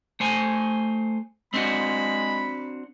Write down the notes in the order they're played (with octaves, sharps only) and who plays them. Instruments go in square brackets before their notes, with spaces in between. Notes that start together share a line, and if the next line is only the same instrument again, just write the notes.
[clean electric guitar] A3 C5 G#5
[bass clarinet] G#3 [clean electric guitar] C4 D4 F#4 [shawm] B5